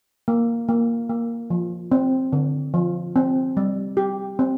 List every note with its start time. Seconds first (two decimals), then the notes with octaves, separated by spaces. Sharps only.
0.28 A#3
0.68 A#3
1.09 A#3
1.50 F3
1.92 C4
2.33 D3
2.74 F3
3.16 C4
3.57 G3
3.97 G4
4.39 C4